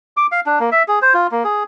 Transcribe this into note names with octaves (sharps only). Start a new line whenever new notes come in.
D6
F5
D4
A#3
E5
G#4
C5
F4
A#3
G#4